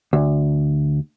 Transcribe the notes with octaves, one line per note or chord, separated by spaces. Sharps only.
D2